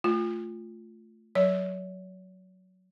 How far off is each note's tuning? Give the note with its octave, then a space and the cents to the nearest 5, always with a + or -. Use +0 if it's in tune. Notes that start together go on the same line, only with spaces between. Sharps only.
A3 +0 F4 +0
F#3 +0 C#5 +40